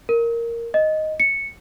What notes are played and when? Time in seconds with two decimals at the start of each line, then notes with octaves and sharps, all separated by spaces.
0.09 A#4
0.74 D#5
1.20 C#7